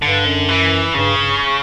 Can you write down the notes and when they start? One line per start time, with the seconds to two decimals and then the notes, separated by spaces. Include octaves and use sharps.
0.02 G2 D3
0.26 F#2
0.49 E3
0.94 G2 C#3
1.18 G2